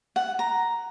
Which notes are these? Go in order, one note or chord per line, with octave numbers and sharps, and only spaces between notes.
F#5
A#5